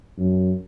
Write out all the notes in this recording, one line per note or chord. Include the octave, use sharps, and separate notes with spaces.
F#2